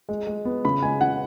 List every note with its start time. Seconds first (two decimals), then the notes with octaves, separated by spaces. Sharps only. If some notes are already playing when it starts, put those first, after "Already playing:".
0.09 G#3
0.27 G#3
0.45 B3
0.65 C#3 B5
0.83 G#3 G#5
1.01 C#3 F#5